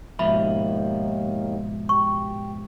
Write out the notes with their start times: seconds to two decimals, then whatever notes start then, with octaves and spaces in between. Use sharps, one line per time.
0.19 D#2 G#2 B2 D#3 F3 A#3 E5 B5
1.89 G4 C#6